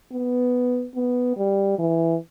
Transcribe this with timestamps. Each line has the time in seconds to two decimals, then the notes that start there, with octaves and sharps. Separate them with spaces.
0.12 B3
0.96 B3
1.37 G3
1.79 E3